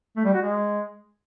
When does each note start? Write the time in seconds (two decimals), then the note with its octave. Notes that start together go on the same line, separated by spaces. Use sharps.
0.17 A3
0.25 G3
0.34 F#4
0.42 G#3